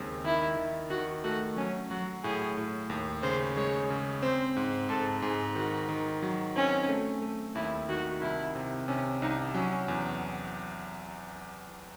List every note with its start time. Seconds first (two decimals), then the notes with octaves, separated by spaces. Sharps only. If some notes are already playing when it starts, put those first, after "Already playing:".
Already playing: D#2 C#3 G#3 C4
0.24 D#3 E4
0.57 D#3
0.90 D#3 F#4
1.24 A3 F#4
1.56 F#3 C#4
1.90 F#3 F#4
2.24 A2 G#4
2.57 A2
2.90 D#2
3.23 C#3 C5
3.57 G#3 C#5
3.90 C#3
4.23 C4 C5
4.56 G#2
4.89 G#2 A4
5.22 G#2 G#4
5.55 D#3 F#4
5.89 D#3
6.22 F#3
6.55 C4 C#4
6.89 A3
7.22 A3
7.55 D#2 E4
7.89 D#3 F#4
8.21 C2 E4
8.55 C3
8.88 C3 C#4
9.22 C2 D#4
9.54 F#3 C#4
9.88 E2